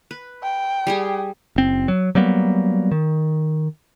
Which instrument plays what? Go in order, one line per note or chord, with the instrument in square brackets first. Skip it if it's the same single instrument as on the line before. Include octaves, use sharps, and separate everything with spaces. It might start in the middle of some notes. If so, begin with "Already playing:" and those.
[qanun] B4
[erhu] G5
[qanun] G3 G4 G#4
[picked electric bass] F#1 C4
F#3
F#3 G3 A#3 B3
D#3